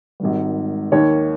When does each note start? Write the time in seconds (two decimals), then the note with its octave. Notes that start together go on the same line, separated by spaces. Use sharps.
0.20 G#1 G#2 D#3 G3
0.92 D#2 D#3 A#3 C#5